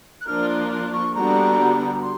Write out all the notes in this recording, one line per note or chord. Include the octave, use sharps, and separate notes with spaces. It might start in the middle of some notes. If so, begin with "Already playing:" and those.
F#6
F3 A#3 D4 F4 A#4 F6
F#6
F#6
C#6
D3 G3 B3 D4 F#4 A#5
C6